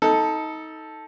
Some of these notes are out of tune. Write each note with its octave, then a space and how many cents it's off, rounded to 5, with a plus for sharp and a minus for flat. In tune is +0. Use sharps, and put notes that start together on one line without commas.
D#4 +25 A4 +0